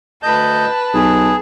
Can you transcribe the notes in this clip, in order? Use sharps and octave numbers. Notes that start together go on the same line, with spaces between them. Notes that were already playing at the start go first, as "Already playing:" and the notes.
D2 B4 D#5 A5 G6
B1 G#4